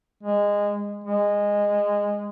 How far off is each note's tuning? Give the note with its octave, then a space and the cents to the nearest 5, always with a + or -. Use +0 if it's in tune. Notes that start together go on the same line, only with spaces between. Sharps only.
G#3 -20
G#3 -15